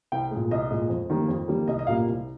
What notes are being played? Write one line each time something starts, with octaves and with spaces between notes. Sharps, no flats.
C2 G5
A#2 G#3
C2 D#5
A#2 G#3
F2
D#3 G3 A#3
F2
D#3 G3 A#3
C2 D#5
D#5
A#2 G3 A#3 F5
C2